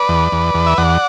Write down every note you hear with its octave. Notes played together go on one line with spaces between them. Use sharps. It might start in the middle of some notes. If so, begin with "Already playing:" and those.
Already playing: B4 D5
E2
E2
E2
E5
E2 D5 F#5